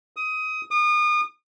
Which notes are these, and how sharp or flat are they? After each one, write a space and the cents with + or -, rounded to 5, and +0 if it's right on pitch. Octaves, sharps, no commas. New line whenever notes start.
D#6 +20
D#6 -35